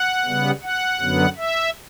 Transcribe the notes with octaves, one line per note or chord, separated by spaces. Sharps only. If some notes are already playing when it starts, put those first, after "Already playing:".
Already playing: F#5
C#3 G3 B3
F#5
F#2 D3 F#3 B3
E5